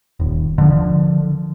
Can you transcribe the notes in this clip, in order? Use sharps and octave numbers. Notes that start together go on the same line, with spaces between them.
D#1
D3 F3